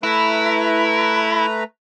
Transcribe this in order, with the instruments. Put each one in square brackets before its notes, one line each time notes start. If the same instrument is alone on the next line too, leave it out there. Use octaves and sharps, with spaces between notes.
[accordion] A3 B4 A#5 [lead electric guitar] E4